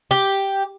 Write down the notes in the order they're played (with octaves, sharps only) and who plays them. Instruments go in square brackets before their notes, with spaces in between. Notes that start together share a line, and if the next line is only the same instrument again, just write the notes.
[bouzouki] G4